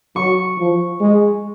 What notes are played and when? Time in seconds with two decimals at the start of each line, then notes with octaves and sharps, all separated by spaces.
0.16 F#3 C#6
0.58 F3
1.01 G#3